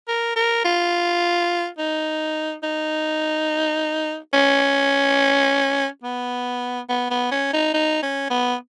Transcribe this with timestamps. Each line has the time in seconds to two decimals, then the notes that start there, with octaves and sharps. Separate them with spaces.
0.08 A#4
0.36 A#4
0.65 F4
1.78 D#4
2.63 D#4
4.34 C#4
6.04 B3
6.89 B3
7.10 B3
7.32 C#4
7.53 D#4
7.74 D#4
8.03 C#4
8.30 B3